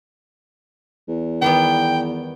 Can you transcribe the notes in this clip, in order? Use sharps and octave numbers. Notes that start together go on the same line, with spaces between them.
E2
D#3 G3 B3 G5